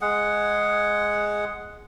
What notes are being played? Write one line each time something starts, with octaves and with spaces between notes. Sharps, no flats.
G#3 G#4 F#5